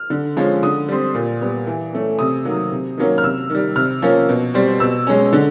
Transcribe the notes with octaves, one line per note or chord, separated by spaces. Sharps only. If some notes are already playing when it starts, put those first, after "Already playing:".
Already playing: F6
D3
F3 G#3 C#4
D3 D#6
G3 C4
A#2
G3 B3
E3
A3 C#4
C3 D#6
D#3 F#3 A#3
C3
D#3 F#3 A#3 C#4
F6
C3 E6
D#3 G3
C3 F6
F3 A#3 C#4
B2
G3 C4
B2 E6
G#3 C#4
D3